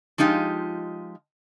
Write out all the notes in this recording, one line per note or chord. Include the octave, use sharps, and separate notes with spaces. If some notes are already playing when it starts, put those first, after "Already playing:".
F3 G#3 D#4 F4 G4